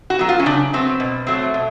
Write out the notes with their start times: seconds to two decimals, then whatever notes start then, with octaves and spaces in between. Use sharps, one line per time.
0.10 F#4
0.19 F#3 B3
0.29 F4
0.40 C#4
0.46 C#3 D4
0.73 F#3 B3 C4
1.00 B2
1.27 F#3 A3 C4
1.54 B2